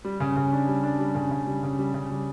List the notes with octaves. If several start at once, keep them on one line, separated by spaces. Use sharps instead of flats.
G3
C#3
C#3
D4
G3
D4
G3
C#3
C#3
G3
C#3
G3
C#3
G3